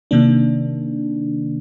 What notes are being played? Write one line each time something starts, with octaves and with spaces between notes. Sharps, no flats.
C3 D#3 A#3 D4